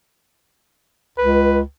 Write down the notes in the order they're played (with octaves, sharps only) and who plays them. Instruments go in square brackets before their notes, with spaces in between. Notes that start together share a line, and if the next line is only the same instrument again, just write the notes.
[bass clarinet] C#2 [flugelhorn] B4